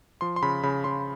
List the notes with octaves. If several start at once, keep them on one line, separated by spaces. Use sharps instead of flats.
F3 C6
C6
C#3 B5
C#3 B5
C#3 C6